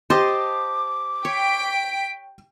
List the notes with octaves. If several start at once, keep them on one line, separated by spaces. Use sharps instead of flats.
G4 C5 D#5 A5 C6 D6
C#5 G5 B6 D7